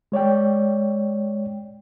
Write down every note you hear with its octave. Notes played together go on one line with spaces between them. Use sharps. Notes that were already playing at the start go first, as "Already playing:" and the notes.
G#3 C#5 D5 G5